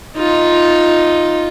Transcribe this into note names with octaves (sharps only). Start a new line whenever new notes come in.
D#4 F4